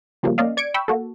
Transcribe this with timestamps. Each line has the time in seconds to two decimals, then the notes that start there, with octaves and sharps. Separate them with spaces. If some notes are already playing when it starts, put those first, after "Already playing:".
0.23 C#3 F3 G3 A#3
0.38 A#3 C#4 D5 D#5 F5
0.57 D5 G#6 C#7 D7
0.74 G5 B5 C#6 E6
0.88 A#3 F#4 A4